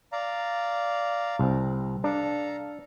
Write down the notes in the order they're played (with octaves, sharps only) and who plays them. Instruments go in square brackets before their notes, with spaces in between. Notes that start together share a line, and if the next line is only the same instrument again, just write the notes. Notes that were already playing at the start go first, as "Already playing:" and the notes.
[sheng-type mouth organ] D5 F5 A#5
[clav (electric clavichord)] C2 C4
[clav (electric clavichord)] D4 [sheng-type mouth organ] A4 F5 A#5